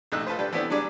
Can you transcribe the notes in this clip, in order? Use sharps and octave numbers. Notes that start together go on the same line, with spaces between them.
A#1 C3 A3 D#4 E6 F#6
F4 A4 B4 C5
G3 D4 A4 B4 G5
E3 A3 B3 C4 D4 E4
D3 F#3 G3 D4 G#4 D5